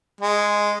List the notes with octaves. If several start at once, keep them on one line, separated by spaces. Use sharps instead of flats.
G#3